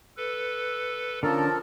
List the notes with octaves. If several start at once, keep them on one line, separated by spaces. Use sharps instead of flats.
A4 B4
D3 F3 C#4 A4 A#4